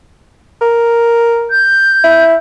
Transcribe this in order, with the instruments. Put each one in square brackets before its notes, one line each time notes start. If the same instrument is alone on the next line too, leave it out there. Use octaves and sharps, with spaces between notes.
[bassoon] A#4
[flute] G6
[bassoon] E4